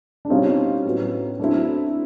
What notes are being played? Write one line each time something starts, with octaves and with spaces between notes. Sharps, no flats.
D4
B2 G3 C4 C#4 D#4 F4
A2 F#3 B3
F#3 A3 C4 D4 E4